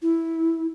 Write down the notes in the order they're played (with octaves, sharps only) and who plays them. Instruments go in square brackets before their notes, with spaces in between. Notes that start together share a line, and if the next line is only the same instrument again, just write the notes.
[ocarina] E4